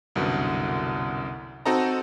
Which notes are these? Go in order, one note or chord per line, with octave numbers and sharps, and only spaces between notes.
C2 F#2 B2 D3
C4 D#4 F#4 A4 D#5 A#5